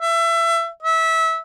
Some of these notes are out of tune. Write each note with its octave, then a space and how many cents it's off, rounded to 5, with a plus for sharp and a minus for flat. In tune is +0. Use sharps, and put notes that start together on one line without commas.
E5 +25
E5 -20